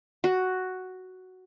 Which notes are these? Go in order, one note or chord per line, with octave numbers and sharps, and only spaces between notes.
F#4